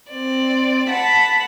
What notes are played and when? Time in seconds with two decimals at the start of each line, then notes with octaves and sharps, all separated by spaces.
0.10 C4 D5
0.88 F#5 A5 B5